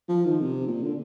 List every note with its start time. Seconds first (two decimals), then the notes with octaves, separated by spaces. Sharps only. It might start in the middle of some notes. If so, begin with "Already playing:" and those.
0.09 F3
0.25 D#3
0.41 C3
0.67 A#2
0.82 D3